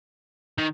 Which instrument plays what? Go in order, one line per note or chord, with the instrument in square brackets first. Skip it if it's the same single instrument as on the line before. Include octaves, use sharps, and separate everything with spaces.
[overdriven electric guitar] D#3